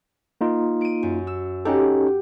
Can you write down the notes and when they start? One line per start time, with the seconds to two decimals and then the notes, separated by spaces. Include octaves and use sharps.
0.41 A#3 D#4 F4
0.81 D7 D#7
1.03 F#2
1.27 E6
1.65 C#4 D#4 G4 A4 F#5